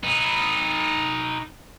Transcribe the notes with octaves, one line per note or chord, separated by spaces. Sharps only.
D#4 B4